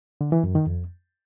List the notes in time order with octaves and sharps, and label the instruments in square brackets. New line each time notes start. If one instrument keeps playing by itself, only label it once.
[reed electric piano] D3
E3
F#2
D#3
F2